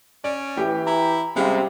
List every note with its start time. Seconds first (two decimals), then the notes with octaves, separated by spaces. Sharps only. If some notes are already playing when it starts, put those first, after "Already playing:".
0.24 C#4 D5
0.57 A2 E3 G4
0.87 E4 A#5
1.36 C3 G3 G#3 C4 C#4 G4 F5 B5